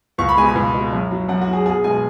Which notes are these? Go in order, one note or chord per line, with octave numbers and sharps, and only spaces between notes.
C#2 C#6
B5
B2 G#3 G#5
B5
C#2
B2 G#3
F#2
F#3
F#2 F#5
F#4
F#3
G#4
B1 G#4
B2 G#3 G#5